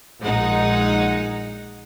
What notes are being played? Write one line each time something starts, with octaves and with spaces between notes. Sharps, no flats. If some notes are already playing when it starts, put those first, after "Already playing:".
A#1 G#3 D#4 F#5